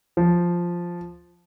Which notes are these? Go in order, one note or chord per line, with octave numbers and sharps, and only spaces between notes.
F3